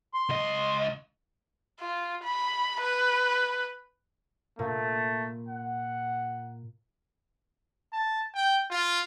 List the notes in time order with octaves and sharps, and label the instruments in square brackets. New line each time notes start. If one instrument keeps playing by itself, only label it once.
[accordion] C6
[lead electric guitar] C#2 D#5
[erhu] F4
B5
B4
[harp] A#2 [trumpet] A3
[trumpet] F#5
A5
G5
F4